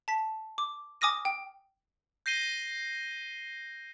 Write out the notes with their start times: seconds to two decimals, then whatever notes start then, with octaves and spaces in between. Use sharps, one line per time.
0.08 A5 B6
0.58 D6
1.01 G#5 D6 D#6 F6 A#6 D#7
1.25 G5
2.26 G6 A#6 C7 D#7 G7